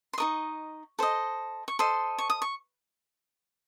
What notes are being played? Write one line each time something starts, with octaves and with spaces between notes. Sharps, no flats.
C6
D#4 A#4 D#5 C#6
A4 C5 D#5
C#6
A4 C5 D#5 C6
C#6
D#6
C#6